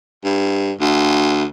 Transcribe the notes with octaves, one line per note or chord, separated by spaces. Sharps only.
G2
D2